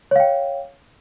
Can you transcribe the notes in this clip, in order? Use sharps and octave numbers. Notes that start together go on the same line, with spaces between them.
C#5 F5 G5